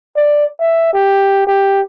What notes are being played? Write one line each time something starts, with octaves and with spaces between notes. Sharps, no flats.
D5
E5
G4
G4